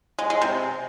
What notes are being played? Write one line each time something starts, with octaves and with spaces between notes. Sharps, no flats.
G#3
G#3
C3